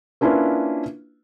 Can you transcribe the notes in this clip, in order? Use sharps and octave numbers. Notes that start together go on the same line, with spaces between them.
A#3 C#4 D4 E4 F4 B4